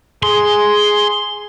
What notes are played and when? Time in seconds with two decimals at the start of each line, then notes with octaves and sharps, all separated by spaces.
0.23 G#4 C6